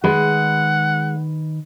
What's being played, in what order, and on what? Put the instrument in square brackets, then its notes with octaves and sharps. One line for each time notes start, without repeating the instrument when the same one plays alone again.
[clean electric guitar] D#3 B4 B5 [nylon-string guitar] G#3 [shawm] F#5